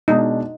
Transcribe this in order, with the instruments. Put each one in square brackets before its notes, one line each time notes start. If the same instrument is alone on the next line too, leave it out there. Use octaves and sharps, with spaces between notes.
[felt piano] B2 G#3 D4 [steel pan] D#4